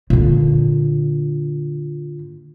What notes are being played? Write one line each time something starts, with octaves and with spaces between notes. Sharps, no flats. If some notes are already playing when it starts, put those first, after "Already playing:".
A#2 D3